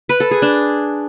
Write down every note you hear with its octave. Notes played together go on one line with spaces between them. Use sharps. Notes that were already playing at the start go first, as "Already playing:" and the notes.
B4
A4
G#4
D4